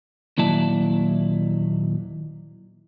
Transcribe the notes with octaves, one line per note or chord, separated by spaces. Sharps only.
D#2 A#2 F#3 E4 D5 A5